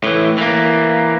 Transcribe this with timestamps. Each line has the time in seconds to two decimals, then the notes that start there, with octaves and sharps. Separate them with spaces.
0.04 A2 E3
0.38 E3 A#3